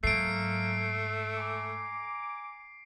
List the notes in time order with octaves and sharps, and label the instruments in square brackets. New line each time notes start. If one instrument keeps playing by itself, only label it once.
[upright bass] G#2 [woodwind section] F#3 A#3 [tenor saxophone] A3 [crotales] C7 D7
[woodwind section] G#5 A#5 D6